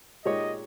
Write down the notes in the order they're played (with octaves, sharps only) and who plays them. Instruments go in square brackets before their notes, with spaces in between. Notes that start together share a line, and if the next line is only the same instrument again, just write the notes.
[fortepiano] A#2 G#3 D#4 G4 C#5 [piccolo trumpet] D#5